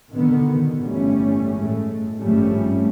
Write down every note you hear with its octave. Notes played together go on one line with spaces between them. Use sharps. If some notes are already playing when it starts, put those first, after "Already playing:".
B2 D3 D#3 B3
G1 A2 E3 G3 A3 C#4
A2 G#3 A3
G#1 G2 F3 G3 A3 C#4